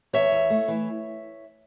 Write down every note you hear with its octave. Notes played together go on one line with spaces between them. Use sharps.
E2 C#5 E5
E2
A3
E3